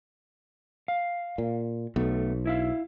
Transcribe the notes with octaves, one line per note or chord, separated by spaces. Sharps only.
F5
A#2
B1 A3 B3
E4 E5 F5